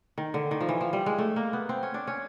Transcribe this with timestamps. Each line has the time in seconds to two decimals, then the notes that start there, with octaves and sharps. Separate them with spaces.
0.18 D#3
0.34 D3
0.51 D#3
0.61 F3
0.69 E3
0.81 F3
0.93 G3
1.06 G#3
1.18 A3
1.36 A#3
1.53 B3
1.69 C4
1.83 C#4
1.94 D4
2.07 C#4